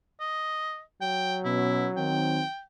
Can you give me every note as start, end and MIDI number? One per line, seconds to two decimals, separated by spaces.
0.20 0.81 75
1.01 2.44 54
1.01 1.38 79
1.45 1.89 47
1.45 1.89 61
1.45 1.88 64
1.97 2.41 51
1.97 2.41 60
1.97 2.62 79